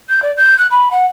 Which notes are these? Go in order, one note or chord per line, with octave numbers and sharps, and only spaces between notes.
G6
D5
G6
F#6
B5
F#5